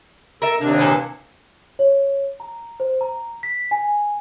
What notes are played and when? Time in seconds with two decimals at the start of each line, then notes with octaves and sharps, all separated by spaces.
0.42 A4 A#4 E5
0.61 D#2 C3 A#3 D4
0.79 A#2 E3 B3
1.79 C#5
2.40 A#5
2.80 C5
3.01 A#5
3.43 B6
3.71 G#5